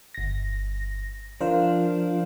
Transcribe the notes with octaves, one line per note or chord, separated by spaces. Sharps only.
G1 A#6
F3 D4 A#4 C5 F5